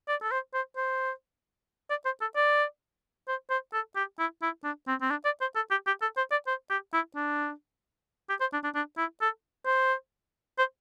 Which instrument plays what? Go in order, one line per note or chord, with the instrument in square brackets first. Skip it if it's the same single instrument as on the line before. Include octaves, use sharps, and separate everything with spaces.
[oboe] D5
A4
C5
C5
C5
D5
C5
A4
D5
C5
C5
A4
G4
E4
E4
D4
C4
C4
D4
D5
C5
A4
G4
G4
A4
C5
D5
C5
G4
E4
D4
G4
C5
D4
D4
D4
E4
A4
C5
C5